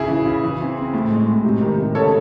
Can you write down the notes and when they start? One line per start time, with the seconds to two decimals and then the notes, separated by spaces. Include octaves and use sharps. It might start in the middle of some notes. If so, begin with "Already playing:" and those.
Already playing: C#3 C#4 E4 G#4
0.08 E3
0.26 C#3
0.43 E3
0.60 C4
0.77 C4
0.94 A2
1.11 G#3
1.27 A2
1.45 C3
1.61 D#3
1.79 C3
1.95 C#3 A4 C#5